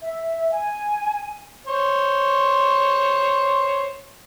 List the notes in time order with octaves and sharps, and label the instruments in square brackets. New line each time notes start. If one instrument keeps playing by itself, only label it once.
[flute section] E5
G#5
[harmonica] C5 C#5